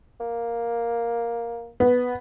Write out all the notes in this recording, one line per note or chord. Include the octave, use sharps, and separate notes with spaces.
A#3
B3